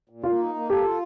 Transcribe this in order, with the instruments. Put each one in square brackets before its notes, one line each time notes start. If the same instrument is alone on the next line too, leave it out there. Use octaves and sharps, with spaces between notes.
[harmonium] A#2
[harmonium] A#3 [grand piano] F4
[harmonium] D#4
A#3
[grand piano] G4 [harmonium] A4
[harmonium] F4